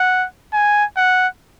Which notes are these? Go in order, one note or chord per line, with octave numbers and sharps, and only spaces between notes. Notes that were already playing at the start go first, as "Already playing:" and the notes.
Already playing: F#5
G#5
F#5